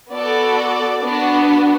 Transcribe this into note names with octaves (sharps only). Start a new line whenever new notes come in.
B3 F#4 A4 D5
B3 D4 F#4